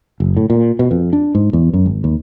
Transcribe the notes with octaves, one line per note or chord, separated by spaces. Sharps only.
F#1
A2
A#2
B2
F2
D4
G#2
E2
F#2
G#1
D#2